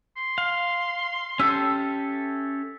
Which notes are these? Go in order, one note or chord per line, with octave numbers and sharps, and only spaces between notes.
C6
F5
C#4 G4 A4 E5